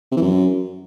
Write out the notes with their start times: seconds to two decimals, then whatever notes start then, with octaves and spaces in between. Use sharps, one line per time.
0.12 C3
0.17 E3
0.22 F#2